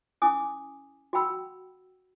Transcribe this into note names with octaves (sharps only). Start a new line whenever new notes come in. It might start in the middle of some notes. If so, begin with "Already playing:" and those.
C#4 E4 G#5 D6 D#6
F#4 F#5 G5 B5 E6